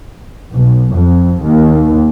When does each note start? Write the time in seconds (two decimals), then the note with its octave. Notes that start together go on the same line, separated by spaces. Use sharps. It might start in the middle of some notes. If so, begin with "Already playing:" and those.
0.54 B1
0.94 F2
1.42 D#2